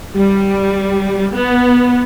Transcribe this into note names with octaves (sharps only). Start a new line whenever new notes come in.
G3
B3